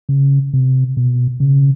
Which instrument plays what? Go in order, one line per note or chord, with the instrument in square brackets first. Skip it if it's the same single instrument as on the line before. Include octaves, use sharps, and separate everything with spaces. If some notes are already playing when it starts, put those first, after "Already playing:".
[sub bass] C#3
C3
B2
C#3